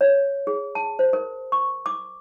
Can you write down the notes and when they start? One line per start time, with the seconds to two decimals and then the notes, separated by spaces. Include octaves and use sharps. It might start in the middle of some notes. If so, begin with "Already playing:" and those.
0.01 C#5
0.47 G#4
0.75 A5
0.99 C5
1.13 A#4
1.52 C#6
1.86 D6